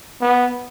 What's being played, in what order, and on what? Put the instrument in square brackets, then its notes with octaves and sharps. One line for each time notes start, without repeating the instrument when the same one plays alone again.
[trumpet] B3